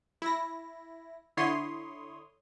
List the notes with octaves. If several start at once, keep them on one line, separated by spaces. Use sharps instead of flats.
E4 A#6
D3 E4 C#5 C6 D#6